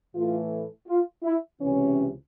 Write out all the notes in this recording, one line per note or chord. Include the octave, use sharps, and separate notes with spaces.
A2 E3 A3 F4
F4
E4
C#2 C3 E3 C#4